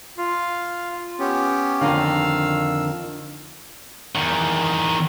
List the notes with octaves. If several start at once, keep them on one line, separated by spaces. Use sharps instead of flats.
F4 F5
B3 C#4 G4
F2 D3 D#3 F5
E6
E2 D#3